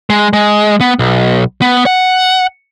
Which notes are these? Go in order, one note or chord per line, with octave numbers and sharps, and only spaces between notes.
G#3
G#3
B3
B1
B3
F#5